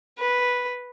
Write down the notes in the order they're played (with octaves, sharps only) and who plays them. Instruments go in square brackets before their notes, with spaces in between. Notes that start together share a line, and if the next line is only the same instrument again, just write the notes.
[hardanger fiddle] B4